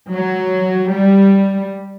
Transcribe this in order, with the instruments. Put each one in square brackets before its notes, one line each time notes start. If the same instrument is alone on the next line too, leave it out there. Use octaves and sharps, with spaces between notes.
[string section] F#3
G3